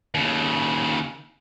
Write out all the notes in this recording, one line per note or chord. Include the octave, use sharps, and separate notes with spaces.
D#2 C#3